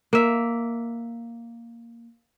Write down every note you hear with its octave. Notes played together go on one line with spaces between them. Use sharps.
A#3 E5